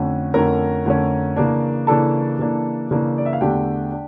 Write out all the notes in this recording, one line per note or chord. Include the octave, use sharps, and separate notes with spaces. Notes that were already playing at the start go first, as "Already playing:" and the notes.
Already playing: F2 D3 A3 C#4
F2 D3 A3 C#4 A#4 A#5
F2 D3 A3 C#4
C#3 E3 A#3 D4
C#3 E3 A#3 D4 A4 A5
C#3 E3 A#3 D4
C#3 E3 A#3 D4
D5
E5
F5
E2 D3 A3 D4 G4 G5
D4